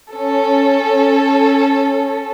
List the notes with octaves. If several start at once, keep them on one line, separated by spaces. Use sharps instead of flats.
C#4 A4